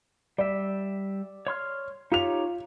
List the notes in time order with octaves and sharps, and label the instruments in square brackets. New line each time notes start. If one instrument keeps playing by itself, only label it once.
[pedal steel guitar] G3 E5 [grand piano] D5
[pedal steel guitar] C#5 C6 F6
[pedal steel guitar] D#4 G4 C#5 [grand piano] F4 F7